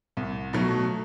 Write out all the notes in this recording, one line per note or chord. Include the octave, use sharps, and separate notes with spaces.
C2
B2 F#3 A3